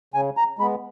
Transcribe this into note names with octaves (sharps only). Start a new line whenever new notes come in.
C#3 G#5
A#5
G#3 B3 B5